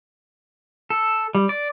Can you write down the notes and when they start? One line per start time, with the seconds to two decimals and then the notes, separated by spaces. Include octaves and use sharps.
0.90 A4
1.35 G3
1.49 D5